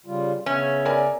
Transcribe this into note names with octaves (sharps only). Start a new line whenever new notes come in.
C#3 G3 F4
C#3 B3 C#4 E5
A#4 D5 G#5